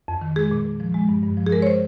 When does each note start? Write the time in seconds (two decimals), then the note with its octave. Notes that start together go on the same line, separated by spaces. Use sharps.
0.08 F2
0.21 D#3
0.36 G#3 G#4
0.51 A#2
0.65 A#2
0.80 F3
0.94 G#3
1.09 G2
1.23 G2
1.37 F3
1.46 G#4
1.52 G#3 A#4
1.62 C#5
1.67 C5